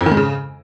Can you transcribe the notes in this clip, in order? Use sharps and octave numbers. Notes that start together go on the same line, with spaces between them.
F2
D#3
G#2
C#3